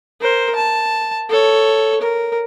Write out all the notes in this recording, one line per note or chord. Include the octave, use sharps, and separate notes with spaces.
A#4 C5
A5
A4 C#5
A#4